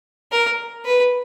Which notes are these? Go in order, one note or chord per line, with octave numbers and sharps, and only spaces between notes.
A#4
B4